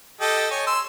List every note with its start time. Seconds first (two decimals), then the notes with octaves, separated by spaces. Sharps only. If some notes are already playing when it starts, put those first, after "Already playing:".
0.21 G4 A4 D#5
0.51 C#5 G#5
0.67 C6 E6